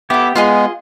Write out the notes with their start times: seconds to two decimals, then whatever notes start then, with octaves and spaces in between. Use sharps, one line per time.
0.10 B3 E4 G4 A4 D6
0.35 G#3 B3 F4 G#4 D#5